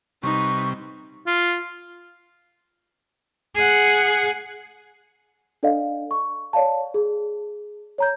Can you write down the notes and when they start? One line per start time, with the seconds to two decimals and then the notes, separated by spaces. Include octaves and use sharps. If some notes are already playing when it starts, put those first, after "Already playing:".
0.23 C3 G3 D#4 B4 C#6
1.27 F4
3.55 G#4 F#5
5.63 D4 A4 D5 D#5 F5
6.11 C#6
6.53 C#5 D5 F5 A5
6.94 G#4
7.98 C#5 A#5 G6